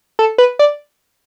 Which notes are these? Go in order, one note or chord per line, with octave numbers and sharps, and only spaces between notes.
A4
B4
D5